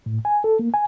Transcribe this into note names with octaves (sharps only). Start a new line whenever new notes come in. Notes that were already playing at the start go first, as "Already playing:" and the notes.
A2
G#5
A4
A#3
G#5